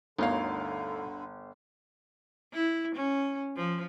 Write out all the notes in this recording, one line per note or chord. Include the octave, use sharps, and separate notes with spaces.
G1 D2 D3 D#4 A#4 C#5 F5
E4
C#4
F3